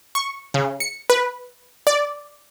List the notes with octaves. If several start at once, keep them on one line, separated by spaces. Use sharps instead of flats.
C#6
C#3
C#7
B4
D5